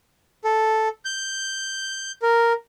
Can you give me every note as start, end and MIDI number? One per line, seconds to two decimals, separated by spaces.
0.44 0.88 69
1.05 2.12 91
2.22 2.53 70